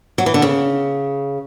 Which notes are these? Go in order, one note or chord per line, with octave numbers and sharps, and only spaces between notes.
F#3
E3
D3
C#3